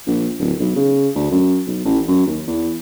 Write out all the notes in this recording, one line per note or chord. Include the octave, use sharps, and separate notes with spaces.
A#1
D1
B1
C#3
D2
F#2
B1
A1
F#2
D#2
E2